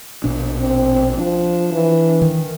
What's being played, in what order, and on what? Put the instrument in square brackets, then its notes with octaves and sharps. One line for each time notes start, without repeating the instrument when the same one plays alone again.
[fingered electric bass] A#1 B2 D4
[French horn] C4
[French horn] F3 [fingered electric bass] D4
[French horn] E3
[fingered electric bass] D#3